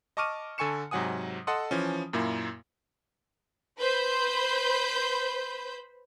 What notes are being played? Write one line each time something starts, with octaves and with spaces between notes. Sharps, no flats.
D#5 A5 C#6 D6 F6 D#7
D3 A4 G#5 C#6 C#7 E7
G#2 C3 F#3 F#5 G#5 D#6
A4 D#5 F#5 A5 C6 D#6
E3 F3 C#4
F#2 A#2 A#3 E4
B4 C5 B5 G6